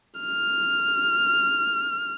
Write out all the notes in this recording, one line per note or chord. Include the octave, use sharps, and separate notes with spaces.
F6